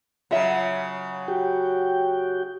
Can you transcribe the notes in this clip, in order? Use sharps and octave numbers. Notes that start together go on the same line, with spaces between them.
C#3 F#3 F4 E5
F#4 G4 G5